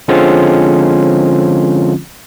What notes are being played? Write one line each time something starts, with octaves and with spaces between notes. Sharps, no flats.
D3 F3 G#3 C4 C#4 F4